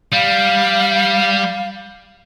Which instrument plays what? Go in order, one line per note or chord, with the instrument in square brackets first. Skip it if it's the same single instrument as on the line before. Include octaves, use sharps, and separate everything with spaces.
[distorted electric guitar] G3 [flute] F5